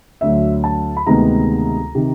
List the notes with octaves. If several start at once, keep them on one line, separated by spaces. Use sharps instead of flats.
D2 D3 F#3 E5
A5
B5
D2 C3 D#3 G#3 B3 A#5
C3 D#3